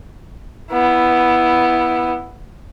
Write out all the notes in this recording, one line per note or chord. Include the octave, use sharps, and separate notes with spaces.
B3 E4